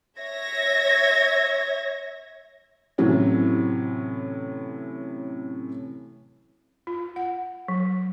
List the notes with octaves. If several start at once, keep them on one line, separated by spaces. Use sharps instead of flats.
C#5 E5 G#6 A#6
A2 C3 E3 F#3 C#4
F4
F#5
F#3